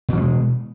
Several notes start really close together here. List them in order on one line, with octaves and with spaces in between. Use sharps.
B2 E3 G3 G#3